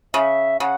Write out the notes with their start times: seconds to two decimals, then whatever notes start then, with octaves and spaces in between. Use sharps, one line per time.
0.14 C#3 E5
0.60 C#3 F#5